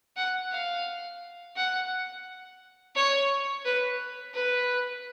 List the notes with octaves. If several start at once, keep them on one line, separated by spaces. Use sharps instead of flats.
F#5
F5
F#5
C#5
B4
B4